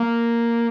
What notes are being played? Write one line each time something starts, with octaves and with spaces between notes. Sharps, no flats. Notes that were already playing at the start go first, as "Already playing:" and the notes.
Already playing: A#3